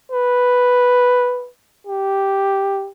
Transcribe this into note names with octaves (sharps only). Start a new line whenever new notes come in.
B4
G4